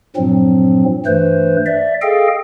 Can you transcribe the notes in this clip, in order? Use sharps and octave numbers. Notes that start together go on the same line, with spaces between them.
G2 A#2 F3 F#3 C4
G2 E3 A3 B4 C5
D5 E5
G#4 A4 D#5 F5 G5